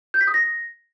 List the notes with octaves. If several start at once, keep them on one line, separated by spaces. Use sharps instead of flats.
G6
B6
D#6
A#6